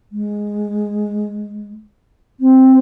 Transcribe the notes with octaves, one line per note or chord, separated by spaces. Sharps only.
G#3
C4